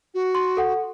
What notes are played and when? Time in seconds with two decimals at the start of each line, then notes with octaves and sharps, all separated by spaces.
0.14 F#4
0.35 C6
0.57 A4 F#5